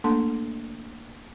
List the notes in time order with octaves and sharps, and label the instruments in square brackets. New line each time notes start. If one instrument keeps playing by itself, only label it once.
[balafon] A3 A#3 D4 A4 A5 C6